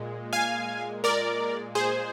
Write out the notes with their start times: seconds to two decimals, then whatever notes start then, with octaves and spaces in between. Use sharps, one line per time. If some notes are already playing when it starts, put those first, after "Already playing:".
Already playing: A#2 G#3
0.33 F5 G#5
1.04 A#4 D5
1.75 G#4 C5